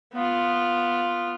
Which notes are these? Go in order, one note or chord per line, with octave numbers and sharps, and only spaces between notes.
B3 F4